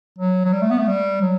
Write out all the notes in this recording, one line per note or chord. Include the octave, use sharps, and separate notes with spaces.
F#3
F#3
G3
A3
B3
A3
G3
F#3